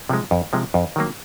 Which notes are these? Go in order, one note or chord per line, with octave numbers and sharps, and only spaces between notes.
C3 F3 G#3
F2
C3 F3 G#3
F2
D#3 F#3 A#3